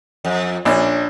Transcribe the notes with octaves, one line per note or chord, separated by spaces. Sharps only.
F2
A#1 C#4 D4